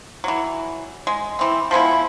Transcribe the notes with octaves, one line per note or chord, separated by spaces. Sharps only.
E3 F#3
G#3
E3 C4
F3 G#3 B3 E4